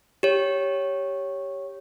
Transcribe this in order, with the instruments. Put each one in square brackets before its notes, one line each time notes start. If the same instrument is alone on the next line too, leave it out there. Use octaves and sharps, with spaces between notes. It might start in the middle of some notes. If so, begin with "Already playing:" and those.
[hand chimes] G4 C#5